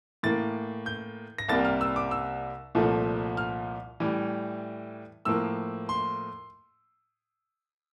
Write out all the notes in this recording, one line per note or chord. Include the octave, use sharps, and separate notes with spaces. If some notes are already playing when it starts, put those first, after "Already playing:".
A2 E3 A#3 A6
G6
A#6
C2 C3 G3 A#3 A6
F6
E6
D6
E6
C2 A#2 F3 A3
F6
A2 E3 G3
A2 F3 A#3 E6
C6